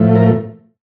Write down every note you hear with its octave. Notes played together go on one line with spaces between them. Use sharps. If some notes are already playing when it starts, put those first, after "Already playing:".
Already playing: A2 F3 A3
A#4